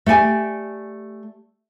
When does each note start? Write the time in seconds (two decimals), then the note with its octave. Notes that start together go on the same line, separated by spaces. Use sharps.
0.06 A3 G4 D5 G#5